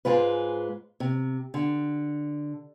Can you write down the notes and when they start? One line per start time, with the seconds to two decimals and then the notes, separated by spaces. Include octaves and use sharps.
0.05 G#2 G#3 F4 B4
1.00 C3
1.54 D3